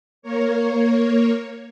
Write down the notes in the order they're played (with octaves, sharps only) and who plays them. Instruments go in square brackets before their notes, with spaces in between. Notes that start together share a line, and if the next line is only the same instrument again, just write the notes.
[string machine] A#3 A#4 C#5